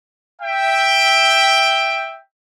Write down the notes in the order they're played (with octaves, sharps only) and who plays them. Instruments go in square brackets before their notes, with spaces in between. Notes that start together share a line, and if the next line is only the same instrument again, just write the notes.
[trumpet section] E5 G5